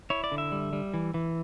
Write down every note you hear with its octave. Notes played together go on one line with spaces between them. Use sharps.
E4 C#5
D5
D3
E5
G3
G3
E3
E3